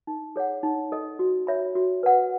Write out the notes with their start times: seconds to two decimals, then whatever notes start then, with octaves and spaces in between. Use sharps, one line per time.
0.07 D#4
0.36 G#4 C#5 F#5
0.63 D#4
0.92 A4 D#5
1.19 F#4
1.47 C#5 E5 B5
1.75 F#4
2.03 B4 F#5